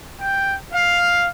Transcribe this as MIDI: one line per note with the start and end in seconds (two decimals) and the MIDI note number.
0.21 0.53 79
0.73 1.28 77